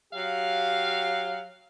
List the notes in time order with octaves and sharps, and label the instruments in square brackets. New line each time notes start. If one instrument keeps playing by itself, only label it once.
[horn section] F#3 G4 F5